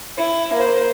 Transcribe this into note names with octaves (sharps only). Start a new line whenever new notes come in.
E4
A#3 C5